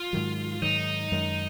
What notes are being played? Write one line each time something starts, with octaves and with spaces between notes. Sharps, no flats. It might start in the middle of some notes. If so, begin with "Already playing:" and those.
Already playing: F4
G#2 D#3 F#3
G#2 D#3 F#3 D#4
F#2 D#3 G#3